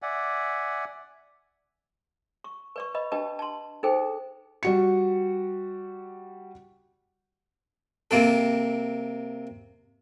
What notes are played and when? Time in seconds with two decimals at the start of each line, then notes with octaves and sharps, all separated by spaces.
0.02 D5 E5 F#5 G#5
2.44 C#6
2.76 B4 D5 C#6
2.94 B4 D#5 B5
3.12 D4 G4 B4 D#5 A5
3.39 A5 C6
3.83 D#4 G#4 A4 C5 G5
4.63 G3 F#4 C#7
8.11 C3 A#3 C4 A4